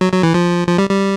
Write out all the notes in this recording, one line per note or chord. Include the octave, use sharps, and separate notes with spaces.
F#3
F#3
E3
F3
F3
G3
G3